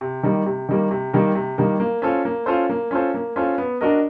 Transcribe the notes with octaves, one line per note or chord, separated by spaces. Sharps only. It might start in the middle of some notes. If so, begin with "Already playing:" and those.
C3
D#3 G3 A#3
C3
D#3 G3 A#3
C3
D#3 G3 A#3
C3
D#3 G3 A#3
A#3
C#4 F4 A4 C5
A#3
C#4 F4 A4 C5
A#3
C#4 F4 A4 C5
A#3
C#4 F4 A4 C5
B3
D4 F#4 A#4 D#5